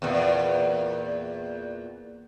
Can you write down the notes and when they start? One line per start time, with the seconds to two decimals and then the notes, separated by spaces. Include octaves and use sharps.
0.02 E2 A#2